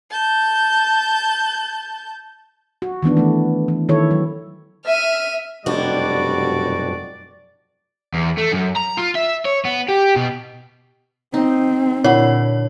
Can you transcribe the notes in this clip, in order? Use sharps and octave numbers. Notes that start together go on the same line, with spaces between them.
A5 G6
F#4
D#3 E3 B3 D4
E3 A3
E3
D#3 E4 A4 C#5
F#3
E5 F6 D#7
F1 F#2 B2 G3 D4 F#4 D5
E2
A3
F#2
A#5
F4
E5
C#5
B3
G4
B2
C4 D#4
A#2 D3 E4 F#4 C#5 F#5